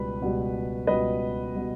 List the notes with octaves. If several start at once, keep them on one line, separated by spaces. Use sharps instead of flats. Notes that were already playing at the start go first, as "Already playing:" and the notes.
Already playing: C#2 B2 G3 B4
C#2 B2 G3
C#2 B2 G3 B4 D#5
B2 G3